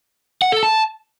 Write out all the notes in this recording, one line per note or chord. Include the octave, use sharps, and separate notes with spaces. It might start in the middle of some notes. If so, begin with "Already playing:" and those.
F#5
A4
A5